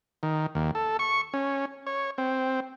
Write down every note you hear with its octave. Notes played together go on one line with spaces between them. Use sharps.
D#3
D#2
A4
C#6
C#4
C#5
C4